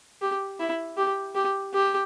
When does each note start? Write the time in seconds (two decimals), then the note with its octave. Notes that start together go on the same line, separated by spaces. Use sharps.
0.22 G4
0.59 E4
0.97 G4
1.35 G4
1.74 G4